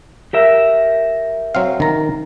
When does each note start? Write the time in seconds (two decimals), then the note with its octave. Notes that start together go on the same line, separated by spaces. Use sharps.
0.33 G4 A#4 E5
1.55 F#3 C4 F5
1.80 D#3 A#5